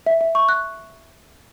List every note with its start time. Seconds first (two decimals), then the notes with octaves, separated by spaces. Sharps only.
0.06 E5
0.21 E5
0.35 C#6
0.49 F#6